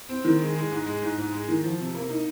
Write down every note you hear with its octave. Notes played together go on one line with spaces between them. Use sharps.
C4
D#3
G#3
G#3
G#2
G#3
G#2
G#2
G#3
D#3
F3
C3
A#3
D#4